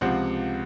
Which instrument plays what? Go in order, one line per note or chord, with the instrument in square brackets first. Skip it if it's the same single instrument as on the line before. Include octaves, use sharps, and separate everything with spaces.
[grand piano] C#2 C3 F3 C4 F#5